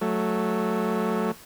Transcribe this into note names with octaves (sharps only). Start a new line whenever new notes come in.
F#3 A3